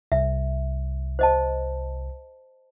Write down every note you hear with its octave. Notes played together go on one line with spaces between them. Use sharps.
C2 E5
C5 D#5 A5